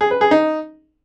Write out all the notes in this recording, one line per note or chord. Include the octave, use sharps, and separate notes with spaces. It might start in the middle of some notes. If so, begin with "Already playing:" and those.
G#4
B4
G#4
D#4